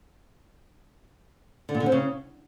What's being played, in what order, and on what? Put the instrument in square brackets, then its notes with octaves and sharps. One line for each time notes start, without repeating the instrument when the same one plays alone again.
[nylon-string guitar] D3
A#2
D3
C4
C#3